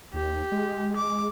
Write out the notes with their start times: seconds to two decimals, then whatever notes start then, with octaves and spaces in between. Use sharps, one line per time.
0.13 D#2 G4
0.52 G#3
0.96 D6